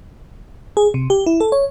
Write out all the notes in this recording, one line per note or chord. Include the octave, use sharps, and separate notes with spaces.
G#4
C3
G4
E4
A4
C#5